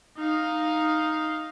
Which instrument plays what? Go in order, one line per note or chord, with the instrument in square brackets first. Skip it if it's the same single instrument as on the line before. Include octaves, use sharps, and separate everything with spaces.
[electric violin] D#4 F5